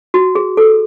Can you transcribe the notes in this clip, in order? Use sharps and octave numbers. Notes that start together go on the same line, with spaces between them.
F#4
G#4
A4